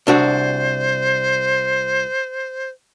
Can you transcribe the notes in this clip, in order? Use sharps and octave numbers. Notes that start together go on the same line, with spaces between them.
C2 D4 F#4 C5